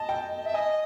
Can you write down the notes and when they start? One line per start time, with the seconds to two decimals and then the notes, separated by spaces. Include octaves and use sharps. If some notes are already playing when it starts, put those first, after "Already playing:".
Already playing: D#5 A5
0.09 G5
0.45 E5
0.54 D#5 G#5